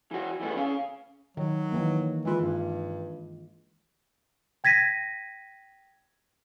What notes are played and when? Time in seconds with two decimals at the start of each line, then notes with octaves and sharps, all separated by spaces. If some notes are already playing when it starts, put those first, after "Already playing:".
0.11 E3 F#4
0.40 E3 G3 A3 B3
0.56 C#3 C#4 F5
1.37 D#3 F#3
1.72 D#3 E3 A#3
2.25 E3 G#3 F4
2.42 G2
4.64 G5 G#6 A#6 B6 D#7